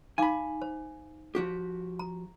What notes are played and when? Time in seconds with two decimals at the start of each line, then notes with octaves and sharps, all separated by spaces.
0.18 D#4 F5 G#5 B5 D6
0.62 C5
1.35 F3 F#4 G4
1.99 A#5